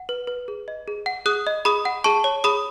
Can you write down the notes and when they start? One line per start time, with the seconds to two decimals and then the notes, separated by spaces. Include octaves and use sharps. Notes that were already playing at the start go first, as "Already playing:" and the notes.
Already playing: F#5
0.09 B4
0.27 B4
0.48 G#4
0.68 D#5
0.88 G#4
1.06 F#5
1.26 G#4 D#6 F#6
1.47 D#5
1.65 G#4 B5 D#6
1.85 F#5
2.04 G#4 A5 C#6
2.24 C#5
2.44 G#4 B5 D#6